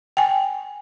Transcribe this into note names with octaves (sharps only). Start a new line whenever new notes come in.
G5 G#5